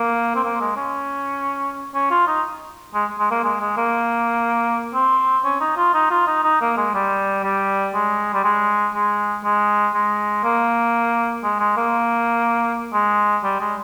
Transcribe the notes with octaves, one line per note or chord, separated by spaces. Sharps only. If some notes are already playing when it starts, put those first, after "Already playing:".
Already playing: A#3
C4
A#3
G#3
C#4
C#4
F4
D#4
G#3
G#3
A#3
G#3
G#3
A#3
C4
C#4
D#4
F4
D#4
F4
D#4
D#4
A#3
G#3
G3
G3
G#3
G3
G#3
G#3
G#3
G#3
A#3
G#3
G#3
A#3
G#3
G3
G#3